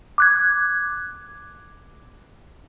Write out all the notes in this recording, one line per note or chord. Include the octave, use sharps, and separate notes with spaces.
D6 F#6 G#6